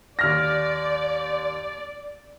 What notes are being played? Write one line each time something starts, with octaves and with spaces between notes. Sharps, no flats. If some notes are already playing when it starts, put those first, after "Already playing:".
D#2 D5 F6 A#6